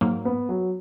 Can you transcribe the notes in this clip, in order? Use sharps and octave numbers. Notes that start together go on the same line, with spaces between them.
G#2 F#3 A#3
B3
F#3